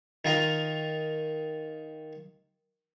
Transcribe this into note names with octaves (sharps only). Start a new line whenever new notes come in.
D#3 F4 A#4